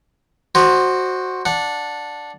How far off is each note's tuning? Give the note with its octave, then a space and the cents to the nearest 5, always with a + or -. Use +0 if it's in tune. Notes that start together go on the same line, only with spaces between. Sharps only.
F#4 +0 C5 +10 D#5 -45
D4 +0 F#5 -25